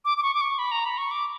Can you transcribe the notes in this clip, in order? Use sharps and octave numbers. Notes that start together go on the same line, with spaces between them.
D6
D6
C#6
D6
C#6
B5
A#5
B5
C#6
D6